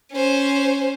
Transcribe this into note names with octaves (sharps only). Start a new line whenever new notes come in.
C#4 C5